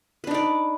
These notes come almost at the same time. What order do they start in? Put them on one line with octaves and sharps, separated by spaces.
B4 D4 D#4 D5